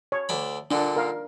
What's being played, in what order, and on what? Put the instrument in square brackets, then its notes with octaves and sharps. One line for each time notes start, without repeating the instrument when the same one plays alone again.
[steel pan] C#5
[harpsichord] D2 D4 B5
[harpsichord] A#2 D3 [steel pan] D4
[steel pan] A#4 F5